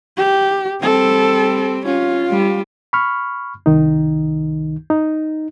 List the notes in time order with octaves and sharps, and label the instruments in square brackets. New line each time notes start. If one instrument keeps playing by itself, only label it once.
[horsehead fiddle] G4
[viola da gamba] G3 C4 [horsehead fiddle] A4
[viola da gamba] C#4 [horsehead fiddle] F4
[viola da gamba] G3
[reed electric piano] B5 C#6 F6
C2 D#3 D#4
D#4